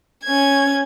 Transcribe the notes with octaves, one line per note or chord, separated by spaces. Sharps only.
C#4 G#6